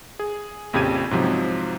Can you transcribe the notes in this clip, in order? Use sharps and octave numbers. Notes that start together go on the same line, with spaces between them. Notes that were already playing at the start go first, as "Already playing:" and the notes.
G#4
A#1 F2 C#3 G4 G#6 D#7
G#2 C3 F3 F#3